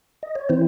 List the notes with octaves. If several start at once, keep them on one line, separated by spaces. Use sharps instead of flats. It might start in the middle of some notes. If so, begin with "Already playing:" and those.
D#5
C#5
E3 C4 E4 C5